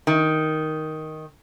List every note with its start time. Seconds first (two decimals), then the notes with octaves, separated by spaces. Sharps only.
0.07 D#3